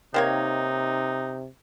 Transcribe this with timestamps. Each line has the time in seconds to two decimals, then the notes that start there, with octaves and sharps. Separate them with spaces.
0.14 C3 D#3 A#3 D#4 C#5